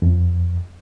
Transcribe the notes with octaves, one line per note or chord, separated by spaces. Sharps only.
F2